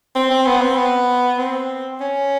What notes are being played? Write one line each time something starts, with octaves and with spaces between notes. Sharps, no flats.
C4
C4
B3
C4
B3
C4
C#4